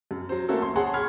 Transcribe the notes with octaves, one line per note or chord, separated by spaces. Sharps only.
F#2
F#3 C5
A3 A#3 C#4 F#4 A4
C6
G#4 C#5 F#5 A5 C6
B5 C#6 F6 G#6